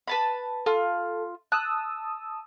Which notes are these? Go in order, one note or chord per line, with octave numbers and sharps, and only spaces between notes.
B4 A5 B5
F4 A4
A5 D#6 E6 F#6